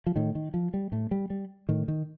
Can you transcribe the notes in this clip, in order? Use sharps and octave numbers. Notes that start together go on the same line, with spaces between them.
F3
A2 D#3
D#3
F3
G3
A2 A3
G3
G3
A2 D#3
D#3